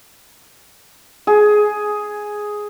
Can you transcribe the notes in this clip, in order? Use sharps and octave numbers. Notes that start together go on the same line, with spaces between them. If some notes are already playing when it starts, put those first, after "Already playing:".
G#4